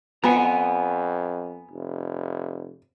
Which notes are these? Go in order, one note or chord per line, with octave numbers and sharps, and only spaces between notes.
F2 B3 F#5 G#5 A#5
F1